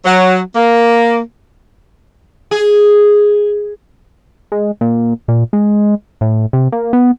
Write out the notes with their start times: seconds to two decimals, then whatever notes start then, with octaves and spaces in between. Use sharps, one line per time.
0.05 F#3
0.55 A#3
2.51 G#4
4.52 G#3
4.81 A#2
5.28 A#2
5.53 G#3
6.21 A2
6.53 C3
6.72 A#3
6.93 B3